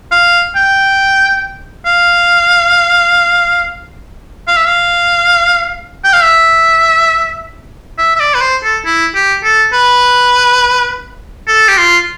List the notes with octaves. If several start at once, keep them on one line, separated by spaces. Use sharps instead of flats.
F5
G5
F5
F5
E5
F5
G5
F5
E5
E5
E5
D5
B4
C5
A4
E4
G4
A4
B4
A4
G4
F4